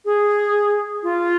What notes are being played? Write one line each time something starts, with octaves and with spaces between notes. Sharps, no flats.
G#4
F4